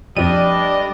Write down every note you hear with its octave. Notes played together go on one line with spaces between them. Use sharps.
F2 F3 G3 A3 D4 B4 D#5 D#7